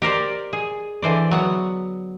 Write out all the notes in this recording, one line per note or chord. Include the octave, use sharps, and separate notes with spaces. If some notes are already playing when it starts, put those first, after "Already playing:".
G4 A#4 C5 D5
G#4
D3 E3 C5 D5
F#3 B3 F#5